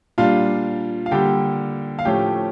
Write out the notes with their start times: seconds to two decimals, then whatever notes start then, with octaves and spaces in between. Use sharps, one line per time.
0.18 A#2 G3 D4 F4 F5
1.06 F5
1.11 D3 G3 A#3 G4 G5
1.99 F5
2.05 A2 F3 A3 C#4 G4 G5